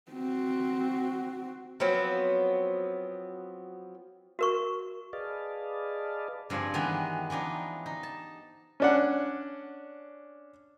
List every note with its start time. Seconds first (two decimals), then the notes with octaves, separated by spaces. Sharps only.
0.12 C4 F#4
1.80 F3 F#3 B3 C4
4.39 F#4 A#4 C#6
5.13 G#4 B4 D5 D#5 F5 A5
6.50 G2 F3 C4 D5 G#5
6.74 D#3 E3 G#3 B3 D4 G4
7.30 E3 F3 D4 D#4
7.86 D#4
8.03 A5
8.80 C#4 D4 F#5